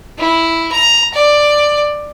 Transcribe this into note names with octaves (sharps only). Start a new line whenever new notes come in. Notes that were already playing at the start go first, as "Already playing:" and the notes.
E4
A#5
D5